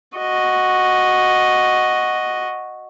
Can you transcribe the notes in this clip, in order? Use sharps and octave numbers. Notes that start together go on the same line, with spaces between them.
F#4 D#5